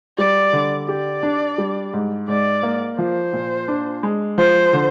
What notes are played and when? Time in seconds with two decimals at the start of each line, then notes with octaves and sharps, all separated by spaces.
0.18 G3 D5
0.53 D3
0.88 G4 D5
1.23 D4
1.58 G3
1.93 G#2
2.28 G#2 D5
2.63 A#3
2.98 F3 C5
3.33 A#2
3.68 D4
4.03 G#3
4.38 F3 C5
4.73 D3